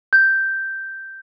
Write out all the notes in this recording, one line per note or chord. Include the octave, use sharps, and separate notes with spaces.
G6